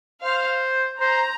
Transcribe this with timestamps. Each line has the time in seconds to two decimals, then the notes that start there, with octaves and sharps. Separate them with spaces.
0.23 C5 F5
1.00 C5 A#5